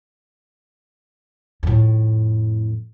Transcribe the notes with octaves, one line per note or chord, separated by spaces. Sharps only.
F2 A2